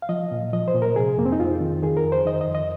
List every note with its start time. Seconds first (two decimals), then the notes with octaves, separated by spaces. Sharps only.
0.02 F5
0.09 F3 D#5
0.31 A#2
0.53 F3 D#5
0.68 C5
0.74 A#2
0.82 A#4
0.96 C3 G#4
1.18 F2 A#3
1.26 C4
1.32 D#4
1.40 F2 F4
1.61 D#3
1.83 D#3 G#4
1.97 A#4
2.04 F2
2.12 C5
2.26 D#3 D#5
2.41 D#5
2.48 F2
2.55 D#5